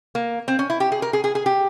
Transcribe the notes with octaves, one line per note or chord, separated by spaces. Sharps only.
A#3
C4
C#4
E4
G4
G#4
A#4
G#4
G#4
G#4
G4